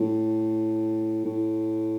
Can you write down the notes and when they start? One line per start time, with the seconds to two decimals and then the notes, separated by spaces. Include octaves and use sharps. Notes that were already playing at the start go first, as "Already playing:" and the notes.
Already playing: A2
1.25 A2